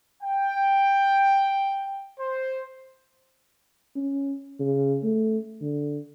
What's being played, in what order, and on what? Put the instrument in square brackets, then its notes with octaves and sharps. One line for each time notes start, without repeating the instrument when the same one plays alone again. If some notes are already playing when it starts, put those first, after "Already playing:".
[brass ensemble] G5
C5
[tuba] C#4
C#3
A3
D3